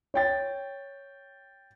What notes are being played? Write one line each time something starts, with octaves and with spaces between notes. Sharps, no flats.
C#5 G5 A6